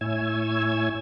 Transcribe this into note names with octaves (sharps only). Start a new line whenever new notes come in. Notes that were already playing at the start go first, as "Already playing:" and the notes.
A2 E4 C#5 G#5 E6 G#6